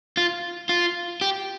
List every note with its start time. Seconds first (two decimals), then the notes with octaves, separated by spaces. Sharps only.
0.17 F4
0.69 F4
1.21 G4